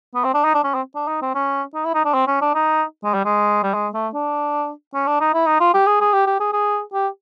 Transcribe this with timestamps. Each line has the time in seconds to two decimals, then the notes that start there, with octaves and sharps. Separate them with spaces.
0.15 B3
0.24 C4
0.34 D4
0.45 D#4
0.55 D4
0.64 C#4
0.74 C4
0.95 D4
1.08 D#4
1.22 C4
1.35 C#4
1.75 D#4
1.85 E4
1.94 D#4
2.05 D4
2.14 C4
2.27 C#4
2.42 D4
2.55 D#4
3.04 G#3
3.14 G3
3.25 G#3
3.63 G3
3.74 G#3
3.94 A3
4.14 D4
4.94 C#4
5.07 D4
5.20 D#4
5.34 E4
5.47 D#4
5.60 F4
5.74 G4
5.87 G#4
6.01 G#4
6.13 G4
6.27 G4
6.40 G#4
6.53 G#4
6.94 G4